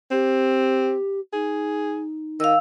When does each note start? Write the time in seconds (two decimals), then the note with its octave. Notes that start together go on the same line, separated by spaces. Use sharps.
0.11 C4 G4
1.33 D#4 G#4
2.40 D#3 F5 E6